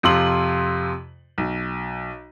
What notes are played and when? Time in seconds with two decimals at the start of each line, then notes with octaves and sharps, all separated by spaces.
0.03 F2 C3 F4 C6 F#7
1.38 B1